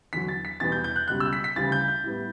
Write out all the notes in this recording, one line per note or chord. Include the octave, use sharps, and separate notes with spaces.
E2 D3 F#3 B6
A6
B6
E2 B2 G3 B3 A6
G6
G6
F#6
C#2 B2 G3 F#6
E6
B6
B6
D2 C#3 E3 G3 A6
G6
G6
A2 G3 B3